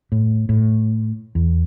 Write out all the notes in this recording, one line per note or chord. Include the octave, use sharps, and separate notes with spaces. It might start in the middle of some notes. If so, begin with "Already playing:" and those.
A2
A2
E2